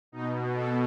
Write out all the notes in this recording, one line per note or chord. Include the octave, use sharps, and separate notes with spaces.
B2 D#4
A4